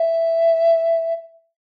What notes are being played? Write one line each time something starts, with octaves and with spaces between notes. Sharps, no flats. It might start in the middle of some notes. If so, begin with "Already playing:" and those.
Already playing: E5